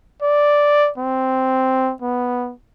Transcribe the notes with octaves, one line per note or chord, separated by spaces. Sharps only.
D5
C4
B3